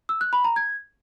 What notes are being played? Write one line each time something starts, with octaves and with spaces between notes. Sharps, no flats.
E6
F#6
B5
A#5
G#6